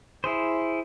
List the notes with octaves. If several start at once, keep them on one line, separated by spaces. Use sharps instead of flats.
E4 G#4 C5